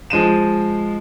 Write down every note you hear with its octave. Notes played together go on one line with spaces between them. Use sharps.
F3 G#3 D#7 E7